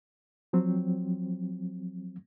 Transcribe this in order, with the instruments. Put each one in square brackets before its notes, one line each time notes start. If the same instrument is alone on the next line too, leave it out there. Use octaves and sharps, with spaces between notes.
[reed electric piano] F3 F#3 C4